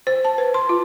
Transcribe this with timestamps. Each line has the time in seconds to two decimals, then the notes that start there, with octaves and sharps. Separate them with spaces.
0.07 C5
0.25 A5
0.38 B4
0.54 C6
0.69 F4